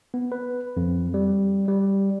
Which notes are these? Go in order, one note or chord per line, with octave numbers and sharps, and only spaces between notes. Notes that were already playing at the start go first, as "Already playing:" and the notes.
B3
B4
F2
G3
G3